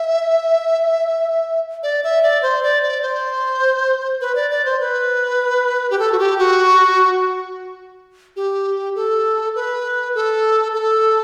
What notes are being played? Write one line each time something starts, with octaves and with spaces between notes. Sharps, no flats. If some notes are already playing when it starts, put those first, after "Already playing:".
Already playing: E5
D5
E5
D5
C5
D5
D5
C5
B4
D5
D5
C5
B4
G4
A4
F#4
G4
F#4
G4
A4
B4
A4
A4